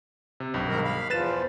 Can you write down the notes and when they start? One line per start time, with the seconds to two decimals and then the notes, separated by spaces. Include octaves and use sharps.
0.40 C3
0.54 B1 G2
0.69 G#2 D#3 A#4
0.84 F5 B5
1.10 E2 F3 B4 A6 E7